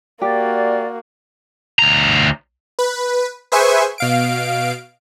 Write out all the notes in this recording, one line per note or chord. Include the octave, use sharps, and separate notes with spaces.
A#3 F#4 G4 D5
D2 A#5
B4
G#4 B4 C5 E5 G#5 C#6
B2 F5 D7